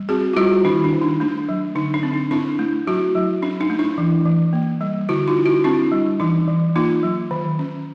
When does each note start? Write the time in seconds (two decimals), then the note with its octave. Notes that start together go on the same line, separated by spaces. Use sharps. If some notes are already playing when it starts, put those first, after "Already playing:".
Already playing: G3
0.09 C4 F#4 G#4
0.33 F4
0.37 G3 E4 F#4
0.65 D#3 D4 E4
0.84 D4
0.93 D#3
1.01 D#4
1.20 A3 D4
1.49 F#3
1.75 D3 D#4
1.94 D4
2.03 C4
2.13 D#4
2.31 C4 D4 E4
2.59 A3
2.87 F#3 E4 F#4
3.15 F#3
3.42 C#4 D4
3.61 D#4
3.70 A3
3.79 D4 E4
3.98 E3
4.25 E3
4.53 A#3
4.81 G3
5.09 D3 E4 F#4
5.28 D#4 F4
5.36 D4
5.45 E4 F#4
5.64 C4 D4 E4
5.92 G3
6.20 E3 D#4
6.48 E3
6.75 A#3 D#4 F4
7.03 F#3
7.31 D#3
7.59 C#4